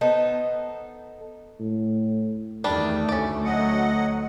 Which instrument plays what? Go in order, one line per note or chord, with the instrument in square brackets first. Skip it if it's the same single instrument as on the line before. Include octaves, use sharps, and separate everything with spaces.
[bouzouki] B3 D#4 A4 C5
[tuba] A2
[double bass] E2 D#3 [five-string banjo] G3 D4 [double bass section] A3
[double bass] D2 [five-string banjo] C#4 D5
[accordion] F#3 D#5 F#5